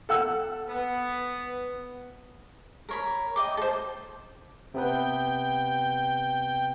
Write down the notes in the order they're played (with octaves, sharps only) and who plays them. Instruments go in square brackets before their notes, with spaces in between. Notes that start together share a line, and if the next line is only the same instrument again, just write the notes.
[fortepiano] A4 F#5 E6
[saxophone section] B3
[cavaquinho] A#4 C#5 B5
D#5 G5 D6
A4 C5
[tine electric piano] C3 B3 B4 [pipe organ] G5